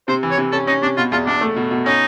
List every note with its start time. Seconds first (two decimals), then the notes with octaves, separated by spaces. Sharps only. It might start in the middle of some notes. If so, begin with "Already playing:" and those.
0.08 C3 C5
0.23 E3
0.31 C#5
0.38 C3
0.52 C#4 A4
0.67 C#4 D#4
0.82 C3 D4
0.97 B2 F4
1.12 E2 F4
1.26 E2 D4
1.41 A3
1.56 B2
1.71 B2
1.86 C#4 D#4